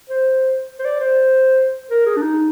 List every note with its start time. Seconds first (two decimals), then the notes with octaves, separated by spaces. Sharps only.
0.09 C5
0.79 C5
0.85 D5
1.00 C5
1.90 A#4
2.06 G#4
2.16 D4
2.21 D#4